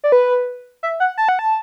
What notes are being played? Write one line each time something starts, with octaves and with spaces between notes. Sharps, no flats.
D5
B4
E5
F#5
A5
F#5
A5